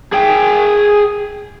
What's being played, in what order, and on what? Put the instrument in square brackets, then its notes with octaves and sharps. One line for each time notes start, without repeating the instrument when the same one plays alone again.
[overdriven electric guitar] G#4 G5